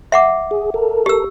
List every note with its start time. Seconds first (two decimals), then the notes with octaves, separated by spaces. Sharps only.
0.12 E5 F#5 D6
0.51 G#4
0.74 A4 A#4
1.06 G4 E6